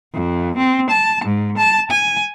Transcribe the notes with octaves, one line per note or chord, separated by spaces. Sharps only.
F2
C4
A5
G#2
A5
G#5